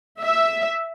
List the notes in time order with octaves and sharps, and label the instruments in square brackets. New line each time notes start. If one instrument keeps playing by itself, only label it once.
[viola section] E5